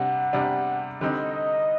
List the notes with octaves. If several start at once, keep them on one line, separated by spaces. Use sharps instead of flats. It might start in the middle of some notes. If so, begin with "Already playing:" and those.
Already playing: C3 G3 D4 F#5
C3 G3 D4
D3 G3 C4 D#4 D#5